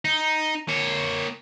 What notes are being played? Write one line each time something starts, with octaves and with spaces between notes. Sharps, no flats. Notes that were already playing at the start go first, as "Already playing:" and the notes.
D#4
A#3 C#5